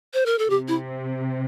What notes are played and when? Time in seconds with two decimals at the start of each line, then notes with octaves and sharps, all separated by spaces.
0.14 C5
0.26 A#4
0.39 A4
0.50 C3 G4
0.68 E4